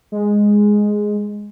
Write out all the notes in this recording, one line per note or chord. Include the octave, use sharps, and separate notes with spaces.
G#3